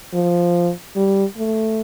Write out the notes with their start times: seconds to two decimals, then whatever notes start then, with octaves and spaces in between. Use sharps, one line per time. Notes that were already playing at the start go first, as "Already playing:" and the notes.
0.14 F3
0.96 G3
1.38 A3